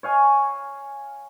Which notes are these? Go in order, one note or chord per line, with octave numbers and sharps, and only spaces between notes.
C#5 F5 G#5